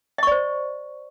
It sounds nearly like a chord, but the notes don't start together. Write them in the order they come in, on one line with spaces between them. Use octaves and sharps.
D#5 C#6 D5 C5